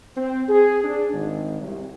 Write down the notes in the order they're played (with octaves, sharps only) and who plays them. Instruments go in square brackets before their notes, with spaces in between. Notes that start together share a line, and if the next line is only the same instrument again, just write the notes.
[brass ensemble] C4
G#4
D4
G#1
C2